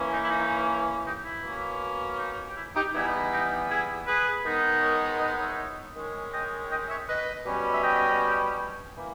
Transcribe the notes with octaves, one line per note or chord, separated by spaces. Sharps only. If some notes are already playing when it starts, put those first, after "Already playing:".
Already playing: E3 A#3 C#4
D#4
E4
D#4
D#4 G4
E4
B2 A#3 C#4
D#4
G4
E4
D#4 G4
E3 G3 B3 D#4 E4 G#4
D#4 G4
E4 G#4
G#4 B4
D#3 G#3 B3 D#4
A#4 C#5
B4 D#5
C#5 E5
D#3 G#3 C#4
D#5 G5
D#5 G5
C#5 E5
B4 D#5
B2 G3 C#4
E5
D#5 G5
E3 A#3